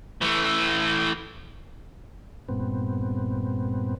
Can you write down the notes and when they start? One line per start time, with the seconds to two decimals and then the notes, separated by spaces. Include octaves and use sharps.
0.21 E3 A3
2.49 G2 A#2 B3 C4